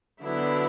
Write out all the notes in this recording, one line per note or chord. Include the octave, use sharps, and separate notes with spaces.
D3 F#3 B3 D4 E4